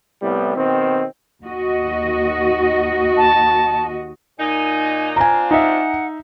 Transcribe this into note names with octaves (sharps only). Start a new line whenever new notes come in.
C2 A2 G3 B3
B2 D#3 C4
D#2 F#4 D#5
A5
A#2 D#4 G#5
C4 D4 F4 G#5 A#5
D#4 E5 F#5